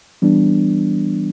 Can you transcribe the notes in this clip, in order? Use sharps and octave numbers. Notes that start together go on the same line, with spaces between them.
E3 G3 B3 D4